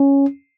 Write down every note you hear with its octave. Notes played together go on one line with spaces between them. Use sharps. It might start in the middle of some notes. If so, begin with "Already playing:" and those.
Already playing: C#4